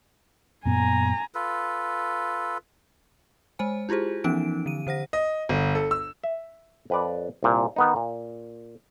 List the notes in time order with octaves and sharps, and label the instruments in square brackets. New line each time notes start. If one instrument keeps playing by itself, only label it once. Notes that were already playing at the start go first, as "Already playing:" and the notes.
[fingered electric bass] F#2 A#2 B3 [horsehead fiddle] G#5 A#5
[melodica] F4 A4 B4
[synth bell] G#3 C5 G#5
E4 F4 G4 G#4 C5
E3 F3 B3 C#4 D#4 D7
D3 D#7
D3 C5 F#5 A#6
[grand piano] D#5
G1
A4
E6
[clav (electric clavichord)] E5
F2 B4 D5
C2 A#2
D#3 B3 D#4
A#2